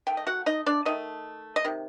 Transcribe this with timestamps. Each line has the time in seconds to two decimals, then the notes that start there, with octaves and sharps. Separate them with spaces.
0.07 D#3 A3 G5
0.17 D#5
0.27 F#4 F#5
0.46 D#4 D#5
0.66 D4 D5
0.85 D#3 A3 D#4 D#5
1.56 D#5
1.65 C3 D#3